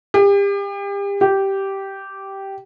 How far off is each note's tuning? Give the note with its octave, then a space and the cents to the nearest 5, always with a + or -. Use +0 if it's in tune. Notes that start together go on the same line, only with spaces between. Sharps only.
G4 +35
G4 -10